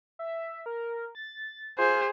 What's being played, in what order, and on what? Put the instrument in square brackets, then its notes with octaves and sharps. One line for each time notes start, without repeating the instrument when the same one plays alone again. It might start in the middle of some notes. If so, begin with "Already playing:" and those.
[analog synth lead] E5
A#4
A6
[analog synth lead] F4 [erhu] G#4 [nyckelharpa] C5